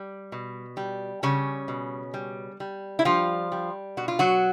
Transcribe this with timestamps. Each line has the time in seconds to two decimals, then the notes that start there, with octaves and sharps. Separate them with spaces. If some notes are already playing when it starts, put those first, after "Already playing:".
Already playing: G3
0.32 B2
0.77 G3
1.23 C#3 G3 C#4
1.68 B2
2.14 G3
2.60 G3
2.99 E4
3.05 F3 G3 F4
3.52 G3
3.97 B2 F#4
4.08 F4
4.19 F#3 F#4